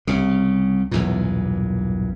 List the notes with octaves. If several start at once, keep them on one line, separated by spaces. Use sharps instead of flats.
C2 C#3
B1 E2 G2 A#2